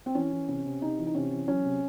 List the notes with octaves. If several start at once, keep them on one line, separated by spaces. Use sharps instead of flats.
C4
E3 C#4
E3
C3 C#4
C3
C3 D#4
E3
D#4
C3 C#4
E3
F#3 C#4
C3